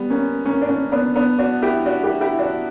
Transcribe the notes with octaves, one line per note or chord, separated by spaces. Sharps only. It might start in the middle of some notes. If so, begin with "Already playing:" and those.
Already playing: G3 B3
A#3 C#4
A#3 C#4
D4
A#3 C#4
B3 D4
B3 D4
D4 F#4
E4 G4
D4 F#4
E4 G4
E4 G4
D4 F#4